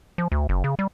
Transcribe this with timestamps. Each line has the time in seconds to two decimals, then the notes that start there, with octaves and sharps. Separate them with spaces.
0.18 F3
0.32 D2
0.49 F#1
0.64 C#3
0.79 G3